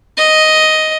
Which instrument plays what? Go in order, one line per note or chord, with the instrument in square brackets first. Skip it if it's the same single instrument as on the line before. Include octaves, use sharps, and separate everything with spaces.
[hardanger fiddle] D#5